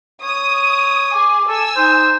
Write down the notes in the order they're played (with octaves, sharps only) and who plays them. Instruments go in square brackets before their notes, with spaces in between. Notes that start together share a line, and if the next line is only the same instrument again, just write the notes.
[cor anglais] C#5 [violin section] D#6
[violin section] G#4 G#5 [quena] D6
[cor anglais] A4 [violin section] G#5 E6
[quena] D#4 [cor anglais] C5